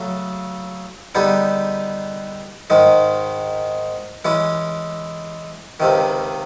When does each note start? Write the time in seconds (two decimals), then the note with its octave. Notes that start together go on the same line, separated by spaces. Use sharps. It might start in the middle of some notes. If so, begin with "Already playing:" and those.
Already playing: C#3 F#3 A3
1.15 D3 G3 B3 D#4 G#4
2.70 G#2 D#3 G#3
4.25 E3 G#3 C#4
5.80 C#2 C3 D#3